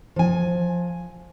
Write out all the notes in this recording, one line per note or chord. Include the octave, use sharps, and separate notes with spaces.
F3 G#5